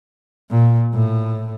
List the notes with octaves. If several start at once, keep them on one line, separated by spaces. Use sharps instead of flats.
A#2
A2